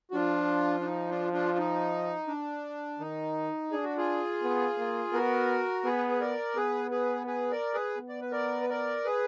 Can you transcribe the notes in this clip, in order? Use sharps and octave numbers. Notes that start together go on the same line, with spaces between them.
F#4
F3 D4 F4
D4
D#4
D4 F4
D4 F4
D#4
D4
D#3 D#4
D4 G#4
F#4
F4 G#4
B3
A#3
B3 F#4 A#4
B3 G#4 B4
B4
A#4 D5
B3 G#4 B4
G#4 B4
G#4 B4
A#4 D5
G#4 B4
B3
D5
B4
A#4 D5
B4
A#4 D5
G#4 B4